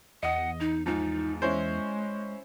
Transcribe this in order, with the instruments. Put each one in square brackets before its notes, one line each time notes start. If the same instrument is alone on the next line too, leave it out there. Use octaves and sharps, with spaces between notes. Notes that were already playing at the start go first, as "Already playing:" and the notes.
[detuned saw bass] E2 [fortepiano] D#5 D#6 [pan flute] F#5
[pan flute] D#4
[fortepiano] G#2 F3 [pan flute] D#4
[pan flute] G#3 [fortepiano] C#4 E4 C5